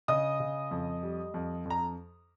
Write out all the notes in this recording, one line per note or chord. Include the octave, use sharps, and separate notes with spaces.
C#3 D#5 D#6
C#3
F2
G3
F2
F2 A#5